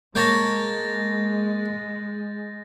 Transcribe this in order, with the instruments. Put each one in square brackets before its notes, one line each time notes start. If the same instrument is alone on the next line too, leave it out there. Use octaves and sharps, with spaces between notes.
[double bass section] G#3 [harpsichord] A#3 C#5 A5 [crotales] G6 A6 A#6